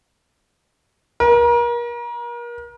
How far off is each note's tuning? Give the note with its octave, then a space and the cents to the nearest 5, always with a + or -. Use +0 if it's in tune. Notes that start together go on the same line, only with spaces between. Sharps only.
A#4 +35